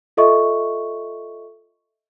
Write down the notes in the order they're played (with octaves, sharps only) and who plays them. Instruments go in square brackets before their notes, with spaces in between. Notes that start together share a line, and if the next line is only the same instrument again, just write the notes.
[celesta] F4 A4 D#5 E5 C#6